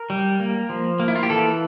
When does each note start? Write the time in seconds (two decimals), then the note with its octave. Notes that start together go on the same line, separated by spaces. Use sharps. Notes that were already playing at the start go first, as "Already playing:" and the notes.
Already playing: A#4
0.10 G3
0.40 A#3
0.69 F3
1.00 A#3
1.08 E4
1.15 F4
1.23 G4
1.30 E3 A4